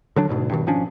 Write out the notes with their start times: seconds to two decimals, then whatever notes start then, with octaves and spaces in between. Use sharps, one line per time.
0.16 D3 F#3 D4
0.29 D2 G#2 B2
0.50 G2 B2 D3 D#3
0.67 G#1 F3 C#4 D4